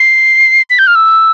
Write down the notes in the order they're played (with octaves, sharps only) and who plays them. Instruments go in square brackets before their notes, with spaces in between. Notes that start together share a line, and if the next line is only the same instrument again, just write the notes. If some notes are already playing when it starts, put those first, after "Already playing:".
Already playing: [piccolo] C7
B6
G6
F6
E6